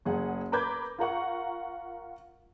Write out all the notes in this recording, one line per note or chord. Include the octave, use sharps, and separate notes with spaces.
F#1 G#4 F#5
A#4 B4 B5 D6 G6 G#6
F4 A#4 F#5 C#6